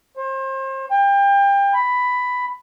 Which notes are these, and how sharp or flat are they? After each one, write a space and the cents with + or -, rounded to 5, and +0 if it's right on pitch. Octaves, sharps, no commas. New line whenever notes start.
C5 +35
G5 +30
B5 +10